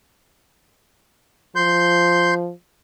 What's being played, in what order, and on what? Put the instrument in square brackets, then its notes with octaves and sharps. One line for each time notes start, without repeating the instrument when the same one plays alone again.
[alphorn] F3 [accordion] C6 G6